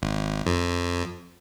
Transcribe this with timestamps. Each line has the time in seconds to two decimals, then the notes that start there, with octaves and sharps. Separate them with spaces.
0.02 G#1
0.46 F2